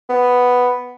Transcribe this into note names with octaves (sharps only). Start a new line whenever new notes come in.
B3